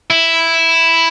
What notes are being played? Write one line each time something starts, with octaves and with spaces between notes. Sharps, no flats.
E4